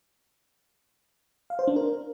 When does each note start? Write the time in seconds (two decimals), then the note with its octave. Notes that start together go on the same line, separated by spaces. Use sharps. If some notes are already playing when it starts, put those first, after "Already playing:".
1.50 F5
1.59 C5
1.68 D4
1.76 A#4